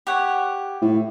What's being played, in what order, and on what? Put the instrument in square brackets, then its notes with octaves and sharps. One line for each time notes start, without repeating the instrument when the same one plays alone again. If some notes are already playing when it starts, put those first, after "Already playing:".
[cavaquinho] G4 C#5 F#5
[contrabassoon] A2